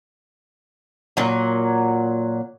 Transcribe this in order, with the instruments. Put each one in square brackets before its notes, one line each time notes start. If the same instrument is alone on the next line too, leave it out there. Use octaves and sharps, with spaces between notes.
[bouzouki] A#2 F#3